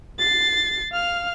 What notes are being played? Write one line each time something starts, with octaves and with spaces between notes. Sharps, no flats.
A6 C7
F5 F6